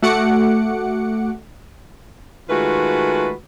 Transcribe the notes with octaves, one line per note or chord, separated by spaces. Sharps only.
A3 F#4 F#5 D6 C#7
D#3 G#3 A3 F4 F#4 B4